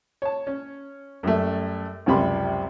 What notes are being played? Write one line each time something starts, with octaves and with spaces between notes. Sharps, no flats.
C#5 A5
C#4 C#5
F#2 G3 A3
C#2 F#2 C3 G3 B5 C6